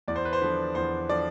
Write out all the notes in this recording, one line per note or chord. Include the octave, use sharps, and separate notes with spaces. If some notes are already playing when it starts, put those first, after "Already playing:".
E2 D5
C5
B4
C5
D3 F3 B4
E2 C5
D3 F3 D5